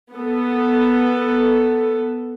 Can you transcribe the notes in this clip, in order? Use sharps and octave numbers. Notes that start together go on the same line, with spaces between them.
B3 A4